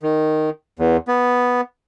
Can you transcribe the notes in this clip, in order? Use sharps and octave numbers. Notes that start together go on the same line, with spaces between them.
D#3
E2
B3